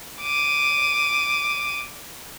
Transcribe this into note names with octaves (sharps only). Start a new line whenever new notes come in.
D6 D#7